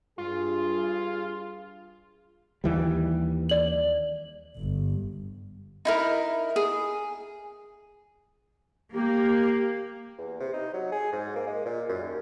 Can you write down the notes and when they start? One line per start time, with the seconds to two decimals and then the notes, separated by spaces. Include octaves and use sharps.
0.18 G2 F4 G#4
2.64 D#2 E3 G3
3.49 D5 F#7
4.58 G1
5.85 D#4 E4 A#4
6.56 G#4
8.93 A#3 G4
10.18 E2
10.40 C3
10.53 D#4
10.73 F#3
10.92 G#4
11.12 G#2
11.35 A#3
11.47 G#3
11.66 A#2
11.89 F#2
12.03 D#2